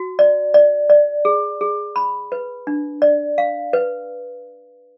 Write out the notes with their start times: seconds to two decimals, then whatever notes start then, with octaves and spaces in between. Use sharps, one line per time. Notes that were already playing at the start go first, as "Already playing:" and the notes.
Already playing: F#4
0.19 D5
0.54 D5
0.90 D5
1.25 G#4
1.61 G#4
1.96 B5
2.32 B4
2.67 D4
3.02 D5
3.38 F5
3.73 B4